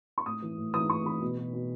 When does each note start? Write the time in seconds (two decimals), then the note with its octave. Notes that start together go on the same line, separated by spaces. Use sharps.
0.18 C#6
0.26 A2 D#6
0.42 E3
0.57 A2
0.74 E3 D#6
0.90 A2 C#6
1.06 E3 B5
1.22 B2
1.38 B2
1.54 B2